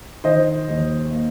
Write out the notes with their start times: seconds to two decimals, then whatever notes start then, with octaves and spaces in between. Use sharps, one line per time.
0.24 D#3 C5 D#5
0.68 D#2
1.11 A#3